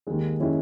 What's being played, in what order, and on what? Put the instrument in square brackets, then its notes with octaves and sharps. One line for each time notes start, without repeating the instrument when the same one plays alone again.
[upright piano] D#2 D#3 G#3 D#4
D#3 G#3 C#4 E4